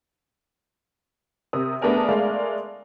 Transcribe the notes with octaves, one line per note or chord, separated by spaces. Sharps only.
C3 A#4 D#6
A3 B3 D4 G#4 A#4 G#5
G#3 A3 A#4 D5 F5